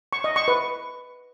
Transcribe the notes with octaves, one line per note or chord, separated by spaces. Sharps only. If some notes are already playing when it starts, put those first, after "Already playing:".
C#6
D#5
C#6
B4